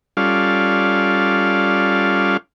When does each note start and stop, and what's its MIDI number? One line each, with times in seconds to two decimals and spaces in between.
0.17 2.37 55
0.17 2.37 61
0.17 2.37 65
0.17 2.37 69
0.17 2.37 74
0.17 2.37 77